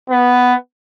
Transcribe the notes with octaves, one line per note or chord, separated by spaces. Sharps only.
B3